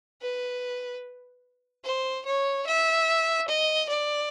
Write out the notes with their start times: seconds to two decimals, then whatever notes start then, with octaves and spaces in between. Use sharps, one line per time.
0.22 B4
1.84 C5
2.26 C#5
2.67 E5
3.48 D#5
3.89 D5